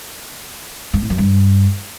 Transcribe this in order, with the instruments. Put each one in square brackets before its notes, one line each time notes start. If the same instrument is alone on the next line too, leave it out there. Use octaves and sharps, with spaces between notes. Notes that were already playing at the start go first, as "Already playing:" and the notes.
[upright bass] G2
A2
F#2
G2